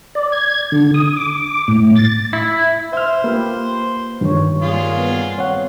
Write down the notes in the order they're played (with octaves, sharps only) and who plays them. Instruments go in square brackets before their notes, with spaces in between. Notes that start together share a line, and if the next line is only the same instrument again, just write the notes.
[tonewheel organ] D5
G#6
D3
D#6
D6
A2
A6
[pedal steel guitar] E4
[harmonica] C5 [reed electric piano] E5 F6
[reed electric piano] A#3 [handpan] F4 G4 B4
[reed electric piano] G2 D#3 [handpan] F3 C#5
[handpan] G3 A#3 [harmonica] F4 G#4 C6
[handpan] B3
[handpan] C4 [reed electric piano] C#5 F#5